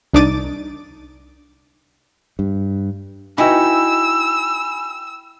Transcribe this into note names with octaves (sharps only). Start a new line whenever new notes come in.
C2 D4 D#4 D6 A6 D#7
G2
D#4 E4 F#4 B4 G5 G#5 B5 E6